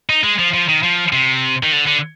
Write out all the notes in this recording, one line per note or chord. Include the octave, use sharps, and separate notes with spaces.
D#4
G#3
F3
F3
D#3
F3
C3
D#3
D3
D3